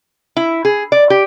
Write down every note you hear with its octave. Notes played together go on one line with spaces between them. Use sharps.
E4
G#4
D5
G4